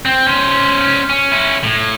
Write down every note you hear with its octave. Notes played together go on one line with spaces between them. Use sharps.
C4
C#4 C5
C#4
C#4 E4
A2